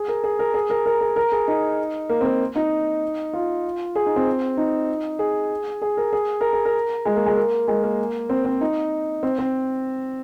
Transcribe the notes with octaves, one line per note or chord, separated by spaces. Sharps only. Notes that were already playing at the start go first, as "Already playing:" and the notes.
Already playing: G#4
A#4
G#4
A#4
G#4
A#4
A#4
G#4
A#4
G#4
D#4
A#3
C4
A#3
D#4
F4
G#4
D#4
C4
D#4
G#4
G#4
A#4
G#4
A#4
G#4
A#4
G#3
A#3
G#3
A#3
G#3
A#3
C4
C4
D#4
C4
C4